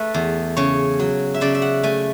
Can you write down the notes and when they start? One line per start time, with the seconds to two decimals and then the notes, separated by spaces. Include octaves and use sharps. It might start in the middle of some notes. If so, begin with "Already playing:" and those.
Already playing: A3 A4 B4
0.14 E2
0.57 C#3 C#5
1.00 F#3
1.34 E5
1.41 C#3 D5
1.55 E5
1.62 F#5
1.83 A3 G#5